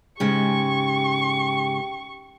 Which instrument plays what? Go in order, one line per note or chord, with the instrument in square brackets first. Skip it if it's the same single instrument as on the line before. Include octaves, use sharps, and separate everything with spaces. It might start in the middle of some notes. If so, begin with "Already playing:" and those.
[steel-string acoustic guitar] G#2 C#3 G#3 [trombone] G4 [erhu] C#6